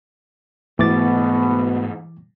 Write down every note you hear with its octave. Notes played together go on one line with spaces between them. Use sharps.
G#2 B2 E3 A3 B3 D6 A6